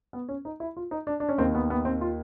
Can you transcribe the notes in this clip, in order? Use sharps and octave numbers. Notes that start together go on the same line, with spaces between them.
B3
C#4
D#4
E4
F4
D#4
D4
D4
C#4
D#2 D#3 C4
B3
B3
C4
F4